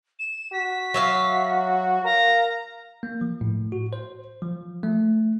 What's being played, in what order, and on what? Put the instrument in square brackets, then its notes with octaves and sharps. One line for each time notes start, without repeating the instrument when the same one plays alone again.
[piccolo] E7
[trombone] F#4 [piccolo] B6
[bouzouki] F#3 E5 F5
[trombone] A#4 [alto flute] F5 [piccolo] A#5
[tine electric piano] A#3
F3
A2
F#4
C5
F3
A3